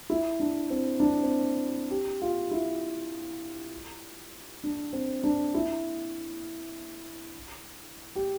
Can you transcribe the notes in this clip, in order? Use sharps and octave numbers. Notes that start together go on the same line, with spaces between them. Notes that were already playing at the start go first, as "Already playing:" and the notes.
E4
D4
C4
D4
C4
G4
F4
E4
D4
C4
D4
E4
G4